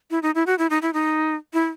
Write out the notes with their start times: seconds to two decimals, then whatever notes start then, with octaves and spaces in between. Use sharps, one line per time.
0.11 E4
0.23 D#4
0.35 E4
0.47 F#4
0.58 E4
0.70 D#4
0.82 E4
0.94 D#4
1.54 E4